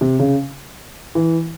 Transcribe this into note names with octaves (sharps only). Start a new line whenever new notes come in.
C3
C#3
E3